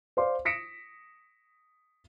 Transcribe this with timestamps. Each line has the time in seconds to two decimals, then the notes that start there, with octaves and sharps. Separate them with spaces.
0.17 C5 D5 F5 C6 D6
0.45 D#6 A#6 B6 C#7 D7 E7